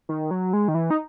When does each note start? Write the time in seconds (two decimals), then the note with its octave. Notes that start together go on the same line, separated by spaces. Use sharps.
0.09 D#3
0.31 F#3
0.53 G#3
0.68 D#3
0.75 E3
0.90 D#4